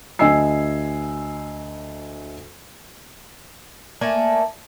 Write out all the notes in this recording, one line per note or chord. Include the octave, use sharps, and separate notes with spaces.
D2 D#5 G#5 E6 C7
A3 A#3 D5 G#5